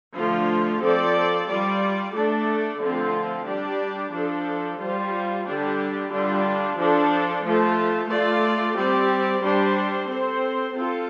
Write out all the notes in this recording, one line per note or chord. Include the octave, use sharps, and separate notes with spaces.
D3 F3 A3 F4
F3 C4 A4 D5
G3 F4 D5
A3 D4 A4 D5
D3 F3 A3 C4 F4
G3 D4 G4 D5
F3 D4 A4
G3 F4 C5
D3 G3 D4 G4
D3 G3 D4 F4
F3 D4 A4
F3 A3 F4
A3 F4 D5
G3 C4 G4 D5
G3 D4 G4 C5
C4 A4 C5
C4 F4 A4